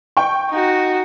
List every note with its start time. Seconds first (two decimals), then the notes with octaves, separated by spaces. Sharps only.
0.17 G5 C#6
0.50 D#4 F#4